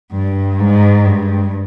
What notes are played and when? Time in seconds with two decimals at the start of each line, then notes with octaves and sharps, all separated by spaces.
0.13 G2
0.59 G#2
1.05 G2